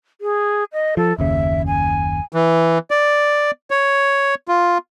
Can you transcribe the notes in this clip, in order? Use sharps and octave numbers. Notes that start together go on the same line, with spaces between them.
G#4
D#5
F3 A4
F#1 D#2 C#3 E5
G#5
E3
D5
C#5
F4